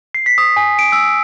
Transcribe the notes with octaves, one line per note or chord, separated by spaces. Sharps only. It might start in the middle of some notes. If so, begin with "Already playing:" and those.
C7
B6
D#6
G#5
D7
E6